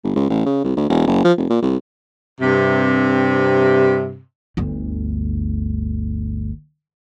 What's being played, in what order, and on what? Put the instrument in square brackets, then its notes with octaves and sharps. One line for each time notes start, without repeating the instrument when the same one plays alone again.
[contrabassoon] G1
C#2
A1
C#3
C2
D2
E1
F#1
F3
F1
A#2
C2
[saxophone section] G2 C3
[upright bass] G1 D2